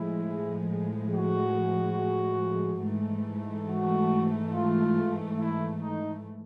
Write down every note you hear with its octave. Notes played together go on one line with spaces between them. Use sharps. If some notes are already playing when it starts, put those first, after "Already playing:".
Already playing: A2 F3 G#3 E4
F#4
G#2 E3 A3
F#4
F4
E4
D#4